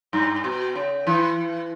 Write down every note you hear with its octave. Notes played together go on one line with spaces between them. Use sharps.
G2
B2
C#3
E3